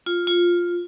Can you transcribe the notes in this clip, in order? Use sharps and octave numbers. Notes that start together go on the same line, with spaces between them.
F4
F4